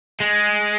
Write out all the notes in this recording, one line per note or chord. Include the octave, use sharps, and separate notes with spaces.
G#3